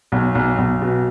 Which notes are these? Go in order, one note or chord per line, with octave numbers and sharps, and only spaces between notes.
B1
B1
B1
B2